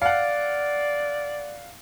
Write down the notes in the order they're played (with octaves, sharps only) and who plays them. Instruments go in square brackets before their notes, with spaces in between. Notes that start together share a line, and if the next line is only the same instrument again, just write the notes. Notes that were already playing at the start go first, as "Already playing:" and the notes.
[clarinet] D5 [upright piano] F5 F#5